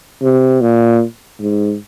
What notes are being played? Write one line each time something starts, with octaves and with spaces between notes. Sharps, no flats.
C3
A#2
G#2